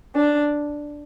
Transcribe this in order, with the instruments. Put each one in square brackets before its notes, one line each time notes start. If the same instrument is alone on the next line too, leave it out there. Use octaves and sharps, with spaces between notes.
[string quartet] D4